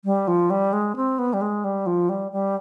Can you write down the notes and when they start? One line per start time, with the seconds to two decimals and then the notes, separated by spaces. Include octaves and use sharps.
0.05 G3
0.28 F3
0.50 G3
0.73 G#3
0.96 C4
1.19 B3
1.33 G3
1.42 G#3
1.64 G3
1.87 F3
2.09 G3
2.32 G3